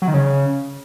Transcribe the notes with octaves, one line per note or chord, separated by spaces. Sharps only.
F#3
D#3
C#3